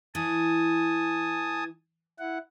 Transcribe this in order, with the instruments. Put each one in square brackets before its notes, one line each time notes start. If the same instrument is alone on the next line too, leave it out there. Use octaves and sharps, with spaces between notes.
[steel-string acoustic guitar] E3 E4 [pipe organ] G#5 A5 D#6
[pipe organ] E4 F#5